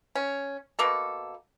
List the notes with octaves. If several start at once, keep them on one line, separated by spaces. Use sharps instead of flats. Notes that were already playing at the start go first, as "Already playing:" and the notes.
C#4
B2 A#3 A4